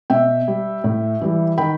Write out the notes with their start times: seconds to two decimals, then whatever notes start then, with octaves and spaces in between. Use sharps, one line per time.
0.10 B2 E5 G5
0.48 G3
0.84 A2
1.22 E3 G3
1.58 D#3 G5 B5